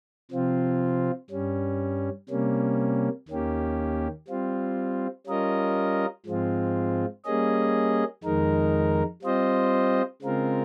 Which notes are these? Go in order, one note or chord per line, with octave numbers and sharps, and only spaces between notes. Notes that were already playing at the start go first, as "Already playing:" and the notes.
C3 F3 C4 F4
G2 G3 C#4
C3 G3 A#3 C#4
D#2 D#3 A#3 C#4 G4
G3 C4 F4
G3 C#4 F4 A#4 D#5
G#2 F3 G#3 C4 F4
G3 A#3 C#4 G#4 D#5
F2 D#3 G#3 D#4 A#4
G3 C4 F4 C5 D#5
C#3 G#3 C4 F4 A#4